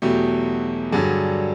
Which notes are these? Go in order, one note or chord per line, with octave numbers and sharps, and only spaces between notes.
E2 B2 F#3 A3 G4
G2 D3 F#3 G#4